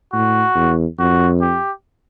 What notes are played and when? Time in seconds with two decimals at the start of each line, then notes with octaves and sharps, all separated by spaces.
0.13 A2 F#4
0.55 E2
0.98 F2 F#4
1.41 G4